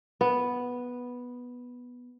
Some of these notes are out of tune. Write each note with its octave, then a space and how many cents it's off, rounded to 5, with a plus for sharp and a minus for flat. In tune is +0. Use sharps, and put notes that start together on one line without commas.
B3 -5